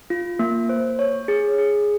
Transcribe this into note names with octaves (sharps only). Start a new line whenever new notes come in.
F4
A#3
C5
C#5
G#4
G#4